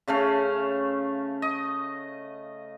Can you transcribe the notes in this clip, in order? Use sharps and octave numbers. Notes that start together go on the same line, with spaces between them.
C#3 A3 C#4 F5
D#5